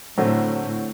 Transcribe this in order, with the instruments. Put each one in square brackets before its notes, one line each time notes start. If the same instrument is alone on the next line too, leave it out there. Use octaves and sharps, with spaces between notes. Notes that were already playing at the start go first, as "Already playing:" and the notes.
[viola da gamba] A2 [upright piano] D3 F#3 A3 C4